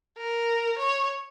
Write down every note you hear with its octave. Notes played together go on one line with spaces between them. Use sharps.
A#4
C#5